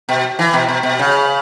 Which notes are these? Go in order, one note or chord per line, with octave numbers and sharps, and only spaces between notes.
B2
E3
B2
B2
B2
C#3